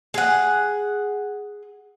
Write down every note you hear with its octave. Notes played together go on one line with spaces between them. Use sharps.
G#4 F#5